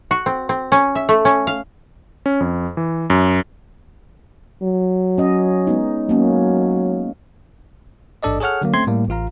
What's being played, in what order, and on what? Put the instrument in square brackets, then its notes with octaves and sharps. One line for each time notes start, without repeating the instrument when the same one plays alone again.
[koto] F#4
C4
C4
C#4
E5
A3
C#4
F5
[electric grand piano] C#4
F2
E3
F#2
[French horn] F#3
[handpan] C#4 D#5
G#3 B3 D#4
[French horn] F#3 [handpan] A#3 C#4
[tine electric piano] A1 G#2 D4 A4 D5 D#5
G#4 A4 C#5 F#5 F6
D3 F#3 A#3
A3 C4 C#4 C6 G#6
A2 G3 A#3
A1 F4 F5 A#5